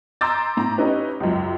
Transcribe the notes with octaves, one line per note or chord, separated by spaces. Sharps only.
A#5 C6 D6 E6 G6 A6
A2 A#5
C#4 D#4 E4 G4 B4
C#2 F#2